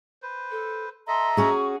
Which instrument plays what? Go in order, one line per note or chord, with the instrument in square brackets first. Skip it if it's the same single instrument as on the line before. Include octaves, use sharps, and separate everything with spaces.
[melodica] B4 C5
[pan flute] A4
[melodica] A4 D#5 E5 [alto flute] A#5 [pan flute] C6
[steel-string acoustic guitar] C#4 F#4 G#4 [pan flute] C#6